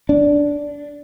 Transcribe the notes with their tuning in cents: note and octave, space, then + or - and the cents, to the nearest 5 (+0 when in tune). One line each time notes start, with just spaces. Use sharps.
D4 -10